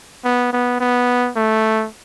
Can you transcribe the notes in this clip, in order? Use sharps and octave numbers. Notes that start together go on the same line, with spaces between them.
B3
B3
B3
A3